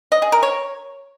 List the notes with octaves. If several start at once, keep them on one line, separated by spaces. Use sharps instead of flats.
D#5
G#4
A#4
C#5